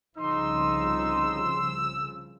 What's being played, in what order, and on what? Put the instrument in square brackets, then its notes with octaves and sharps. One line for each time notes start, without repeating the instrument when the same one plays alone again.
[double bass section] C2 C#3 F3 [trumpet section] D#4 [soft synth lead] C6 [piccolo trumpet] E6